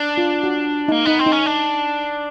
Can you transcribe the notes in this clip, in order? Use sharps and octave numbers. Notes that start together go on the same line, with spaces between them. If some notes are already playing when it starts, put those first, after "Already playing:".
Already playing: D4
F4
F#4
D#4
A#3
B3 D#4
C4
D#4
C#4
D4